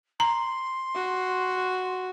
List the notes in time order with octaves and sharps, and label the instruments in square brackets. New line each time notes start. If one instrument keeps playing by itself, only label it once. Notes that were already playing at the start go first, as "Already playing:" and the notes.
[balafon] A#5 [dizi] C6
[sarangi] F#4